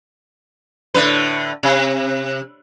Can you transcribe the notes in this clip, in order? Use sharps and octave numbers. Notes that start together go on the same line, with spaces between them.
A2 D3 B4
C3